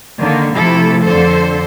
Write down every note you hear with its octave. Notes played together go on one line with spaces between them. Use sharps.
D3 D#3 A#3
C3 F3 A3 E4 A4
F2 D3 A4 C5